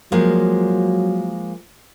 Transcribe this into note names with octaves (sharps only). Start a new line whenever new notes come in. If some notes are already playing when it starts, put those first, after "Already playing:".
F3 F#3 G#3 A#3